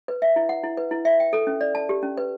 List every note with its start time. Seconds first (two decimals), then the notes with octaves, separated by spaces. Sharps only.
0.08 B4
0.22 E5
0.36 E4
0.49 F#5
0.64 E4
0.77 B4
0.91 E4
1.05 E5
1.20 G5
1.33 A4
1.47 C#4
1.61 D5
1.75 A5
1.89 G4
2.03 C#4
2.17 B4